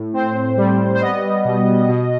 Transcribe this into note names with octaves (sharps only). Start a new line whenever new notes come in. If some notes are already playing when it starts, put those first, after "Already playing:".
Already playing: A2
C4 C5
G3
C5
B3 D#5
B2
B2